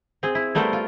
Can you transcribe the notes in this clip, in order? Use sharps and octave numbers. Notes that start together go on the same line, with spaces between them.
C4 G#4
E4
G3 A3 B3 A4 A#4 C5
F4